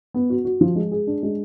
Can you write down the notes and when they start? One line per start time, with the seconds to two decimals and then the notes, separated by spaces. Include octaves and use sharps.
0.14 B3
0.30 F#4
0.45 F#4
0.61 F3
0.76 G#3
0.92 G#4
1.07 D4
1.23 G#3